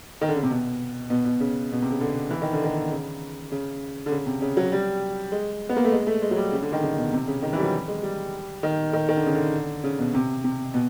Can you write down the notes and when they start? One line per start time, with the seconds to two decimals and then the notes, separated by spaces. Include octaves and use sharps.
0.21 D#3
0.29 D3
0.36 C#3
0.43 C3
0.50 B2
1.10 B2
1.25 B2
1.40 C#3
1.73 B2
1.82 C3
1.91 C#3
2.00 D3
2.30 E3
2.42 D#3
2.53 D3
2.64 D#3
2.91 C#3
3.52 C#3
4.06 D3
4.11 C#3
4.26 C3
4.42 C#3
4.57 F#3
4.72 G3
5.32 G#3
5.69 B3
5.77 A#3
5.85 A3
5.92 G#3
6.07 A3
6.22 G#3
6.31 F#3
6.37 G3
6.52 C#3
6.62 D3
6.72 D#3
6.83 C#3
6.98 B2
7.13 C3
7.28 C#3
7.42 D#3
7.53 E3
7.58 G3
7.63 F#3
7.88 G#3
8.03 G3
8.63 D#3
8.93 D#3
9.09 D#3
9.17 D3
9.26 C#3
9.34 D3
9.84 C#3
9.99 B2
10.14 C3
10.44 C3
10.74 B2